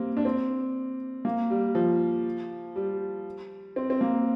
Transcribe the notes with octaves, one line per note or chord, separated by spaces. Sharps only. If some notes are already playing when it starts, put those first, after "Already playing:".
Already playing: G3 A#3 C4
D4
C4
A#3
G3
F3
G3
C4
C4
A#3